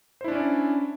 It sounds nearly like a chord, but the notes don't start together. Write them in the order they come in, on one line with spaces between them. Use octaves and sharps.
C5 E4 D4 C#4 D5